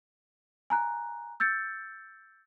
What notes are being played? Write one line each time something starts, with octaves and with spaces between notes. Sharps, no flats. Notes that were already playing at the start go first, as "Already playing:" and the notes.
G#5 A#5 F#6
E6 G6 A6 C#7